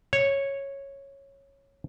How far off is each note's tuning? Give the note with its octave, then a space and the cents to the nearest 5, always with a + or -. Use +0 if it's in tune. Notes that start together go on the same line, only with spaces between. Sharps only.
C#5 -5